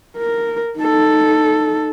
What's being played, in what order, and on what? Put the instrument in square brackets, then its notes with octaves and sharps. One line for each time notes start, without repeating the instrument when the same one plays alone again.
[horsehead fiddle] A#4
D#4 A4